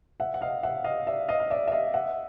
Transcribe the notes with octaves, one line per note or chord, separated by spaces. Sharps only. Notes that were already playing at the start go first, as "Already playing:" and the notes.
E5 F#5
F#5
D#5 F5
E5 F#5
D#5 F5
D5 E5
D#5 F5
F5
D5 E5
E5
D#5 F5
E5 F#5